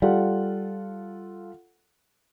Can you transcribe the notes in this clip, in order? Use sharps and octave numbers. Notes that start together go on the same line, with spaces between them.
G3 F4 A4 F#5